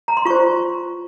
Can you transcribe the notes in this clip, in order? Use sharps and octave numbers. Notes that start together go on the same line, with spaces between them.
A#5
C6
F4 C5 C#6